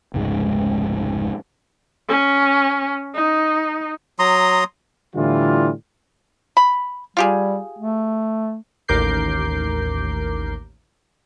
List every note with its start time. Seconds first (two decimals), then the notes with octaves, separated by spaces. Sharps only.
0.14 F1 C#2 G#2 G#3
2.09 C#4
3.15 D#4
4.19 F#3 A#5 C6 D#6
5.16 A2 D3 E3 G3 F4
6.57 B5
7.17 G3 F4 G4 G#4
7.79 A3
8.88 A1 D#2 A#4 D6 G6 C7